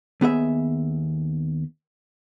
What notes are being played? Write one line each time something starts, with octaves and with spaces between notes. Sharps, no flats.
D#2 B3 G#4 E5